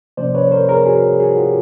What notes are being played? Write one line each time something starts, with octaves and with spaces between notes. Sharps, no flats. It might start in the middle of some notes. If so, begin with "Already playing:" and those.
C3 F3 A#3 C#4 C5 D5
B4 C#5
A#4 C5
G#4 A#4
F#4 G#4
F#4 G#4
F4 G4